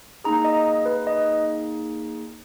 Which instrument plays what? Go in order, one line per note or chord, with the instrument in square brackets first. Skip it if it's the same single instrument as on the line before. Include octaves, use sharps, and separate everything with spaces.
[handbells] A#3 D#4 G#4 A#5
D#5
B4
D#5